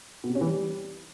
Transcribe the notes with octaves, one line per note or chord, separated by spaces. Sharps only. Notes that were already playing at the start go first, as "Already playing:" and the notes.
B2
C3
C#4
E3
G3